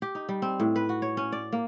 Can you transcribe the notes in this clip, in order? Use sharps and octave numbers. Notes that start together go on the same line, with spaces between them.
G4
D#4
G3
C4
A2
B4
F#4
C#5
C#4
D5
A#3